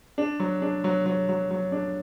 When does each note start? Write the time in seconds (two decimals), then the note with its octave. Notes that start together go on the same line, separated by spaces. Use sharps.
0.18 D4
0.40 F#3
0.62 D4
0.84 F#3
1.06 F#3
1.29 F#3
1.51 F#3
1.72 D4